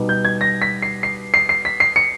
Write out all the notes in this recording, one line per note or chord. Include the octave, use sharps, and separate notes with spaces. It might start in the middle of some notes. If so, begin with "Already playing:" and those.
Already playing: B2 G3 B3 D#4
G6
G#6
A#6
B6
C7
C7
C7
C7
B6
C7
C#7